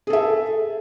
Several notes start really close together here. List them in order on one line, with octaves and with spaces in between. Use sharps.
G#4 A4 E5